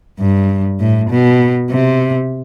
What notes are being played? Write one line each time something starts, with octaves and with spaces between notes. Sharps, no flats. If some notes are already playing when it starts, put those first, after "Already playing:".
G2
A2
B2
C3